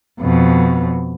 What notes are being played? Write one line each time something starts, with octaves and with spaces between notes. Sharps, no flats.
F2 B2